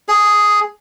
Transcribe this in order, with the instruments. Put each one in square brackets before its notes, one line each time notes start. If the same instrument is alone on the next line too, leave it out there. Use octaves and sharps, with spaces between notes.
[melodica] G#4